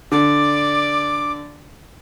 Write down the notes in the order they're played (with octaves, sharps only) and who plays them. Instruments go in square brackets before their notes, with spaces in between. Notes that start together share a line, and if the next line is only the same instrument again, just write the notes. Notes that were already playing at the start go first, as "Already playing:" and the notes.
[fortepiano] D3 [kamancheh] D5 [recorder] D6